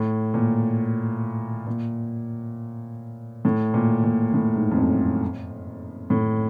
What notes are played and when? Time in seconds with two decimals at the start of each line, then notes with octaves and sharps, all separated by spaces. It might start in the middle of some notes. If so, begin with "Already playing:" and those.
Already playing: A2
0.34 A#2
1.67 A#2
3.45 A2
3.74 A#2
4.04 A#2
4.34 A2
4.56 G#2
4.71 F2
4.78 F#2
6.10 A2